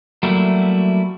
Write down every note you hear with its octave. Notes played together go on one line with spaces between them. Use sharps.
F#3 G3 A3 A#3 E4